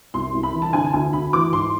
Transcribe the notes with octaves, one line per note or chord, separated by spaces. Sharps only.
C2 C6
C2
B5
E3
A5
D3 G#5
A5
D2 G#5
D2 B5
E3 D6
G#2 C6